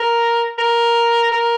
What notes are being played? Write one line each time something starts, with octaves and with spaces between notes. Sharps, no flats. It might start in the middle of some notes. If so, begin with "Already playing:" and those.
Already playing: A#4
A#4
A#4